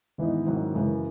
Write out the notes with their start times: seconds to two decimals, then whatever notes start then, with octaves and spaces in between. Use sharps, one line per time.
0.18 G#2 D#3 E3 G#3 B3 D#4
0.47 G#2 D#3 F#3 C#4 E4
0.75 F#2 C#3 E3 G#3